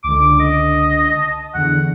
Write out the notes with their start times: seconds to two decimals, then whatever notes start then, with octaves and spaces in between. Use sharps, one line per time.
0.04 C#2 D3 D6
0.40 D#5
1.11 A5
1.54 E2 D3 F#5